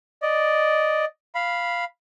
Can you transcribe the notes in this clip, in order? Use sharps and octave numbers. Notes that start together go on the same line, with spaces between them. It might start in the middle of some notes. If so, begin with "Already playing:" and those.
D5 D#5
F5 B5